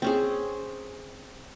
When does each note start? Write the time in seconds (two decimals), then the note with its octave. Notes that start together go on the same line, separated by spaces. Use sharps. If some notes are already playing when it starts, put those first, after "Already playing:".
0.02 C4 C#4 G#4